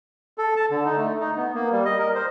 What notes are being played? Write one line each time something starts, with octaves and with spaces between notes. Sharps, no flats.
A4
A5
D3
D#4
A3
D#4
B3
A#3
G3
D#5
A#4
C5